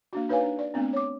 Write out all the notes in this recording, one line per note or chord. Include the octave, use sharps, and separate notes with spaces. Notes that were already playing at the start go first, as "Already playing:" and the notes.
A#3 D4 F#4
D#4 B4 C#5 F5 G#5
D4
D5
A3 B3 C4 D4
C#5 D6